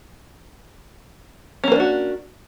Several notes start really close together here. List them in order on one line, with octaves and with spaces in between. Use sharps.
C#4 A#3 B4 D4 F#4